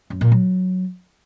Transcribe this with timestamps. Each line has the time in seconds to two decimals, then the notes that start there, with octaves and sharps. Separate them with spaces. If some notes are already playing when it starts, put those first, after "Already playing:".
0.10 F#2
0.21 A#2
0.32 F#3